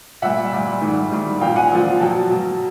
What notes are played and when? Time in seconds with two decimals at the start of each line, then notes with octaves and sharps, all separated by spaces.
0.22 A#2 G3 E5 F#5
0.52 A#2 G3
0.81 G#2 D#3 G3
1.11 G#2 D#3 G3
1.41 A#2 F3 F5 G5
1.56 F#5 G#5
1.72 A#2 F3
2.00 B2 F#3 G5 A5
2.30 B2 F#3